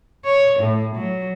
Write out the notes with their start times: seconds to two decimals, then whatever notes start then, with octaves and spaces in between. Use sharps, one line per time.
0.25 C#5
0.60 A2
0.96 F#3